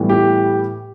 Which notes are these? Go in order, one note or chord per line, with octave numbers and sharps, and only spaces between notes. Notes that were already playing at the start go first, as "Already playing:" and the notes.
Already playing: A2 E3 G3 B3 E4
G4